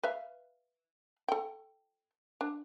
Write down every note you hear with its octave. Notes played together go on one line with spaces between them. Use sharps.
B4 E5 F5
A4 G5
D4